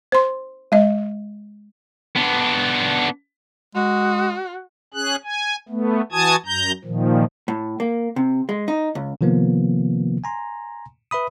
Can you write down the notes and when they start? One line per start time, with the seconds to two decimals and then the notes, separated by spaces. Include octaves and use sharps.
0.12 C5 C6
0.72 G#3 D#5
2.16 B3 D4
3.75 G#3 F#4
4.94 C#4 G#4 F#6
5.24 G#5
5.69 A3 B3
6.12 E3 F#4 G#5 A5 D#6 G#6
6.45 F#2 A#5 G6
6.84 A#2 D#3 F3
7.48 A2
7.80 A#3
8.16 C3
8.49 G#3
8.68 D#4
8.95 C#2
9.21 C3 D#3 F3 A#3 B3
10.24 G#5 A#5 C6
11.11 B4 E5 B5 D#6